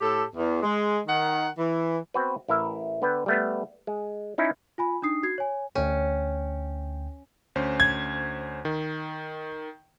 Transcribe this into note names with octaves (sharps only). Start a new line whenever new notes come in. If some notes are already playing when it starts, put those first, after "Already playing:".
A2 G4 A4
E2
G#3
D#3 F#5
E3
B3 C4 F#4 B4
A1 E4 A#4 E5
D3 B3 B4 G5
G3 A3 B3
G#3
C#4 D#4 E4
F4 G#5 B5
D4 D#4 D#6 C7
F#4 G#6 C7
C#5 G#5
D2 C#4 G5
D2 C#4 C5
G#6
D#3